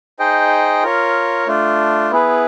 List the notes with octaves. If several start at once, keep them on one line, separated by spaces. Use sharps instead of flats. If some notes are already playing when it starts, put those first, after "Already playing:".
D#4 G#4 C5 D#5 G5
F4 A#4 C#5
A3 D4 F4
B3 E4 G#4 B4